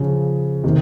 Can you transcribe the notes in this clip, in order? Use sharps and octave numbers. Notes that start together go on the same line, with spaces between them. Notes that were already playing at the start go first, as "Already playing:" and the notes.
Already playing: C#3 F3
C3 D#3